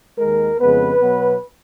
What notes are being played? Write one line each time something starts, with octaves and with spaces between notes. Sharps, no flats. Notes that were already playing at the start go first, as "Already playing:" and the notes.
D#2 D#3 G#3 A#4
F2 C#3 G#3 B3 B4
B2 F#3 B3